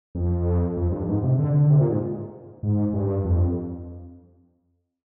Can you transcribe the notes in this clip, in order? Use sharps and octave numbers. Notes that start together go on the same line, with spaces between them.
F2
F2
G2
G#2
C3
D3
D3
C3
A#2
G#2
G#2
G2
F2